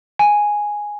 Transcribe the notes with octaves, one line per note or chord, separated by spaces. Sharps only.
G#5